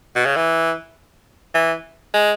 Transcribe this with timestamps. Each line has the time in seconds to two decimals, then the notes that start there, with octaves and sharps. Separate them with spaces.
0.15 B2
0.25 C#3
0.36 E3
1.55 E3
2.14 G#3